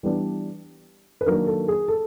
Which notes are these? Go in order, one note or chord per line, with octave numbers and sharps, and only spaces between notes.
E3 G3 B3 D4
B4
D#3 F#3 A#3 D4 A#4
A4
G#4
A4